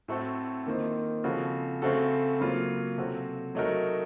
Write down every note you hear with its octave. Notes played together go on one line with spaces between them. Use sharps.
A2 A3 C4 F#4 A4
D#3 A#3 F4 C5 D#5
C#3 F3 C4 F#4 A4
C#3 A3 C4 F#4 A4
C#3 F#3 A#3 F4
C3 F#3 C4 F#4 A4
F#3 A3 D#4 F#4 A#4